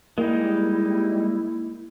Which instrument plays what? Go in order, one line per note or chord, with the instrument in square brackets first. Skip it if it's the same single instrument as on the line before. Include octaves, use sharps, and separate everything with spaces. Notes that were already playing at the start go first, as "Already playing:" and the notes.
[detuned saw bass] G3 [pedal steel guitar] G#3 D#4 [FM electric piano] A#3 [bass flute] E4